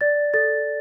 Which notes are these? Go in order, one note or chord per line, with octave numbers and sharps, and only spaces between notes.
D5 A6
A4 A6